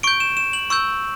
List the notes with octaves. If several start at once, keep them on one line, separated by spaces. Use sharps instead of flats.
C#6 G6 D7
E7
E7
F#7
C#6 E6 G6